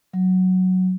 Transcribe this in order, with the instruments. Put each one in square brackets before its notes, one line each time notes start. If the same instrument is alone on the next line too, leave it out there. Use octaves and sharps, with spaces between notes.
[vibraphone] F#3